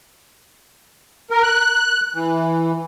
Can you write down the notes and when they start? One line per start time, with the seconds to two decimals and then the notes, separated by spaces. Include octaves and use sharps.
1.30 A#4
1.43 F#6
2.14 E3